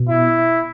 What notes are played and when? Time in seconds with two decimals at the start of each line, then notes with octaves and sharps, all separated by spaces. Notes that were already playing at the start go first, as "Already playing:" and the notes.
Already playing: B2
0.09 E4